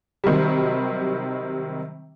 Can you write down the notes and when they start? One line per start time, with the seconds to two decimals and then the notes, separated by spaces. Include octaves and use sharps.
0.24 C3 D#3 F#3 G3